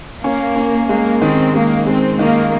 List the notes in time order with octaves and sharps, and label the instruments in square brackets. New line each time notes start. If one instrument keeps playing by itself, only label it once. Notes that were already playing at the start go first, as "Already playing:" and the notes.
[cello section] A#3 [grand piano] C#4
[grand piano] C#4
[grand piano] G#3 [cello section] A#3
[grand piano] D#3 [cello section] C4
[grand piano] G#3 [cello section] A#3
[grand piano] G#3 [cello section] C4
[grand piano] D#3 [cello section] A#3